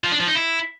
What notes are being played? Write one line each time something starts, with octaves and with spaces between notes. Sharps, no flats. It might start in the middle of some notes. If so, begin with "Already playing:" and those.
F3
D4
F3
D#4
E4